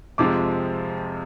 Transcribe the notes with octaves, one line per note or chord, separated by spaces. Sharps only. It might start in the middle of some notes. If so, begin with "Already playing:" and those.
F2 C3 F3 G#3 D6